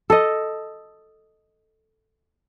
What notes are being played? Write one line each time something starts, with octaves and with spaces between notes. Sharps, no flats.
A4 D#5